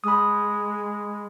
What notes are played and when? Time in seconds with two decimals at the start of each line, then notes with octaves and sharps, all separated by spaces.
0.04 G#3 B5 D#6